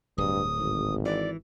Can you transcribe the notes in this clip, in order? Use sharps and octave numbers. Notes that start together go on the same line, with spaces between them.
D1 G2 D#6
G#1
E3 D5